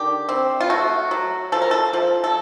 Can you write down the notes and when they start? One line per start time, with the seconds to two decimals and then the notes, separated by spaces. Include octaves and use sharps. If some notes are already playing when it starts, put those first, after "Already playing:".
Already playing: D3 D#3 G4
0.29 C4
0.60 F4
0.70 A3 F#4
1.11 F#3
1.52 F3 A4
1.62 A#4
1.71 A4
1.93 F3
2.24 A4